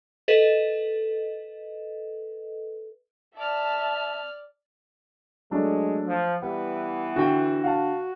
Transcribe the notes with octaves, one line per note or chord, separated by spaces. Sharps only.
A4 B4 D#5
D5 E5 A5 F6
F#3 G#3 A3 D4
F3
E3 G3 B3
D3 F#4 G5
F#4 F5 F#5 A5